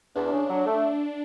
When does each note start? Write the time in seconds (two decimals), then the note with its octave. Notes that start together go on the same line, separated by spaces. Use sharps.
0.15 E2 D4
0.32 C#3
0.49 F#3
0.66 A3